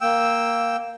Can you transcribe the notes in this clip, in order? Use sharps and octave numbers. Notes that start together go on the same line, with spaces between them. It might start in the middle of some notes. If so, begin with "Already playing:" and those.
A#3 G5 E6